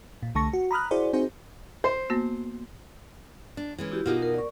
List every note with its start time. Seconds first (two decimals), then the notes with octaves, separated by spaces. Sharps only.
0.23 A#2
0.35 C2 D3 A3 A5 C#6 A#6
0.53 F#4
0.71 A#5 B5 D#6 F6 F#6
0.91 E4 F#4 G#4 C5 D5
1.13 C4 D#4 F#4 G#4 C5
1.84 C5
2.10 A#3 B3 F#4
3.57 D4
3.78 E3 G#3 C#4
3.92 E4 F#4 G4
4.06 B2 A#3 D#4 F4
4.22 A#4
4.34 D5 C#6